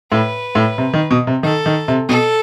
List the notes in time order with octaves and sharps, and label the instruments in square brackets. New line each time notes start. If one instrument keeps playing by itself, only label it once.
[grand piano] A2 [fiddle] B4
[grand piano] A2
C3
D#3
B2
C3
[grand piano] D#3 [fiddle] A4
[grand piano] D#3
C3
[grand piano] B2 [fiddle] A4